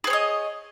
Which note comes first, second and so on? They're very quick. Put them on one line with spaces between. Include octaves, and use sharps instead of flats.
G#4 C5 C#5 D#5